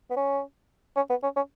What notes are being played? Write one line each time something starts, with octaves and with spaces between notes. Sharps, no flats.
B3
C#4
C#4
B3
C#4
C#4